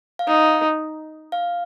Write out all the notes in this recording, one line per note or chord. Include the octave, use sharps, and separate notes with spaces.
F5
D#4 D#5
F5